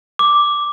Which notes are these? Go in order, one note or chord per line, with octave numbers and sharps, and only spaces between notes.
D6